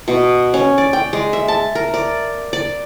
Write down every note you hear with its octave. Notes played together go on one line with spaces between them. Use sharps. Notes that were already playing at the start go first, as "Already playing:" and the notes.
B2
C#4
D5
G5
G#3
E5
A5
A#4
D5
D5